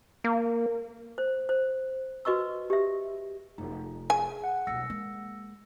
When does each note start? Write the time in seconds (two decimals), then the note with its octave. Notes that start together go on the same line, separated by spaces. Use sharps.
0.24 A#3
1.18 C5
1.49 C5
2.25 F#4 B4 D#5 C#6 E6
2.70 G4 E5
3.58 F1 D#4
4.10 G#4 G#5
4.44 F#5
4.67 D#1 B1 E6 A#6 C#7
4.90 G#3 A#3